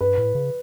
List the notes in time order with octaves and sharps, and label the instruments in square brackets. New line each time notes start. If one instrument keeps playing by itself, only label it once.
[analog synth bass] G2 [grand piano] B4
[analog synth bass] A2
C#3